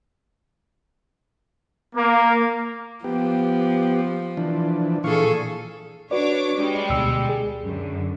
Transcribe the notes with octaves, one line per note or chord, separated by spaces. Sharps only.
A#3
F3 B3 G4
E3 F3 D4
A#2 E3 G#4 A4 F5 C#6
D4 F#4 B4 C#5 D5 D6
G3 G#3
D2 B2 E6
G#4
F#2 D3